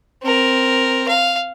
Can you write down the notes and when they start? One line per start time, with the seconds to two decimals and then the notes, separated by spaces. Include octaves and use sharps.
0.23 C4 A#4
1.08 F5